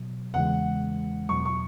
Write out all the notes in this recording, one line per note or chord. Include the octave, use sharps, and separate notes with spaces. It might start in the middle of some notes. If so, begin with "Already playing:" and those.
Already playing: B2 F#3
E2 C#3 E3 G#3 F#5
E2 B2 F#3 C#6
C#6